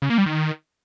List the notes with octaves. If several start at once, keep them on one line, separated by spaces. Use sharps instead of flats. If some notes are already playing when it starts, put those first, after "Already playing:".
C#3
A#3
G3
D#3